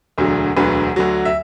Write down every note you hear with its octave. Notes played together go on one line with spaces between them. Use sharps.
E1 D2 D3 F#3
E1 D2 D3 F#3 B4
D2 D3 F#3
E5